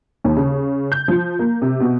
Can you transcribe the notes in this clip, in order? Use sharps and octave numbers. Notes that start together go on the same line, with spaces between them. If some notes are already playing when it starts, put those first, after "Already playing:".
D#2
C#3
G6
F3
A#3
C3
B2